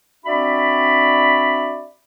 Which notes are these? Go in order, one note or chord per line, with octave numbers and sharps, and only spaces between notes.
C4 D4 F#4 D5 E5 B5